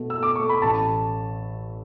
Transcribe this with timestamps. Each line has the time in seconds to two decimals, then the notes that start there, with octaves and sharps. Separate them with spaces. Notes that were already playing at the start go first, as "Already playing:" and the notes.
Already playing: B2 A3
0.10 E6
0.15 A3
0.23 D6
0.36 A3 C#6
0.49 B5
0.62 A1 A5